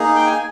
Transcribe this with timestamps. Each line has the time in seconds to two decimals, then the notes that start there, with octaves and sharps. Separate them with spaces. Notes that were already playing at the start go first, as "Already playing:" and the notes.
Already playing: A#3 D#4 G#4
0.15 G5
0.26 G#5